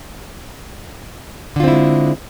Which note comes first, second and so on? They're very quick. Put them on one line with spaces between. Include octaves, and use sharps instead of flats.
D3 F4 C4 E4 G#3